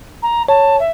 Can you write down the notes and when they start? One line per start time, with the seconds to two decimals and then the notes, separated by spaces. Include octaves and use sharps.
0.22 A#5
0.48 C#5 A5
0.80 E5